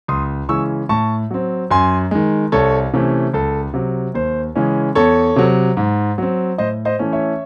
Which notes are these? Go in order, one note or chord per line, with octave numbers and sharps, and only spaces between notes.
C#2 C6 D#6
C#3 E3 G#3 C#4 C#6 E6
A2 A5 C#6
F#3 C4
F#2 G#5 C6
D#3 G#3
C2 A4 C#5
C3 E3 A3 C#4
C#2 A4
C3 F#3
D#2 C5
C#3 E3 G#3 C#4
E2 A4 C#5
C3 F#3
G#2
F#3 C4
A2 C5 D#5
C5 D#5
E3 A3 C#4
C#5 E5